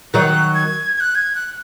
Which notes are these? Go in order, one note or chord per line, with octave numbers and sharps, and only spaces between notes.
D#3 F#3 F#6
G#6
G#6
F#6
G#6
F#6